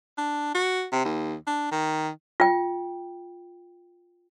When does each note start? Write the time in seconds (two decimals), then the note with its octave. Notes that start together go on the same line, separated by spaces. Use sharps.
0.18 D4
0.55 F#4
0.93 C3
1.05 D#2
1.47 D4
1.72 D#3
2.40 F4 G5